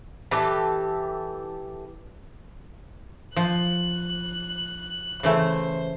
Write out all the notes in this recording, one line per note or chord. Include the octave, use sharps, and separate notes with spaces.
E3 G4 A4
F3 F#6
C#3 E3 A3 C5